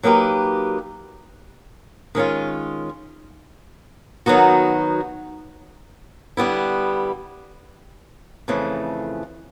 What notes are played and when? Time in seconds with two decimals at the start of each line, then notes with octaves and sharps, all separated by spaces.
0.03 F#3 A#3 D#4 G4 B4
2.15 D#3 G#3 C#4 F4
4.26 D#3 F#3 B3 D#4 F#4
6.37 D3 G3 B3 E4
8.48 F2 C#3 E3 A3